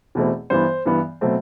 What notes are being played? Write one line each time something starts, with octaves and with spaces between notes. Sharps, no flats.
E2 B2 A3 C4
G2 E3 B3 C5
G2 E3 B3
B2 F#3 A3 C4